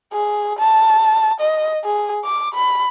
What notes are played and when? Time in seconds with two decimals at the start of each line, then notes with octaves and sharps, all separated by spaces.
0.13 G#4
0.59 A5
1.41 D#5
1.84 G#4
2.25 D6
2.55 B5